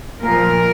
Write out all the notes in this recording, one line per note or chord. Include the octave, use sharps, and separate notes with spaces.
A#2 F3 A#4